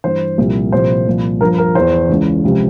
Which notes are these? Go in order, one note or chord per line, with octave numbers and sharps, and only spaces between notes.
G2 E3 C5
C2 A#2 F3
C2 A#2 F3 C5
C2 A#2 F3
G2 F3 A#4
A#4
E2 E3 C5
C#2 C#3 E3
C#2 C3 F3